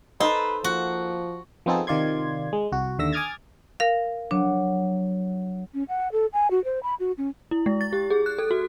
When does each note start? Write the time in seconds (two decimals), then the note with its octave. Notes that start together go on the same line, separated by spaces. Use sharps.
0.20 D#4 A4 B4 C5
0.64 F3 A#3 F#4
1.66 F3 B3 C4 D#4 G#4 A4
1.87 C3 D#3 F4 D5 C6 G#6
2.53 G#3
2.72 C2 F#4
2.99 D#2 D3 E5 E6 A#6
3.13 G#5 D6 D#6 F6 G#6 A6
3.80 A#4 F5
4.31 F#3 D4
5.74 C#4
5.89 F#5
6.12 A4
6.33 G#5
6.51 F#4
6.64 C5
6.83 B5
7.00 F#4
7.18 C#4
7.51 E4
7.66 G#3
7.81 A6
7.93 G4
8.10 G#4
8.26 F#6
8.39 A4
8.51 F#4